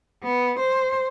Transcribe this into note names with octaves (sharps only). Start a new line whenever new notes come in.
B3
C5